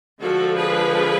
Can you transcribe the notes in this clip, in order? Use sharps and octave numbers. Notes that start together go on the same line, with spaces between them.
D3 F3 G#3 F#4 A4
G#4 B4